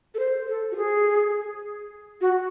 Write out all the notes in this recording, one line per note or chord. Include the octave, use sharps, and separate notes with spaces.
A4
C5
A4
F#4
G#4
F#4